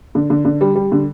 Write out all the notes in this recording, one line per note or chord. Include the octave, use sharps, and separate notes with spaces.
D3
D3
D3
G3
G3
D3